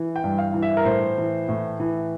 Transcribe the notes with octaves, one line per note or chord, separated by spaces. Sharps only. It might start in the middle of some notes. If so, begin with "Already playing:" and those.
Already playing: E3
G5
G2
F5
E3
E5
A#4
A2 C5
E3
A2
E3